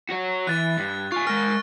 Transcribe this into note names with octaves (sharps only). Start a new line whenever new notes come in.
F#4 C#5
E3 F#6 A6
G2
F4 G#5 C#6
G#3 A#4 F6